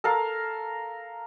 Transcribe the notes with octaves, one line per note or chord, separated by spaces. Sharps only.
A4 A#4 F5